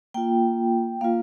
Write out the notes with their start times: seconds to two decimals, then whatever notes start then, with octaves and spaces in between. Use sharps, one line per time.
0.14 A#3 F4 G5
1.01 A#3 F4 F5